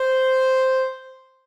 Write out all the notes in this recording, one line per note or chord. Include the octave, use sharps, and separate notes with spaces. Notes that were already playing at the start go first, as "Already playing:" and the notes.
Already playing: C5